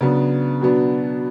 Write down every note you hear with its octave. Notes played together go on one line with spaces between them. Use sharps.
C#3 F#3 B3 D4
B2 F#3 B3 D4